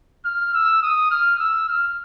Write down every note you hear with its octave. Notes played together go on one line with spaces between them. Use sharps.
F6
E6
D#6
F6
E6
F6